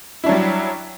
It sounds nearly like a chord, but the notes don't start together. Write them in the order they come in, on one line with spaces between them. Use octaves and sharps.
E4 D4 F#3 G3